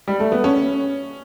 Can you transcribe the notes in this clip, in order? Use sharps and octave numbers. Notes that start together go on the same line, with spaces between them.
G3
A3
B3
C#4